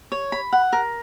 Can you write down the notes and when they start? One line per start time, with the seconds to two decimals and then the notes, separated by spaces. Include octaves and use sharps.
0.12 C#5
0.32 B5
0.53 F#5
0.73 A#4